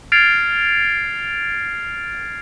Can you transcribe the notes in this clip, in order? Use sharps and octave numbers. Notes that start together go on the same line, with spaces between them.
F6 G#6 A6 C7 D7 F7